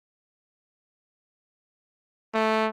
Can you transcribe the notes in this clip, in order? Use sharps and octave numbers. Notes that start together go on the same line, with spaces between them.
A3